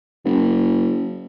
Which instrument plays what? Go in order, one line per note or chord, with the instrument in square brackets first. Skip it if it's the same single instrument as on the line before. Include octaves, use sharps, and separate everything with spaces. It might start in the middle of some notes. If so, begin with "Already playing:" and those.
[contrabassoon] F#1